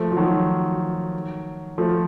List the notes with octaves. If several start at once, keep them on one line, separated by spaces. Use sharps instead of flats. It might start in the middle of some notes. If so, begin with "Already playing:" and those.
Already playing: F3 A3
F3
D#3 F#3
F3 A3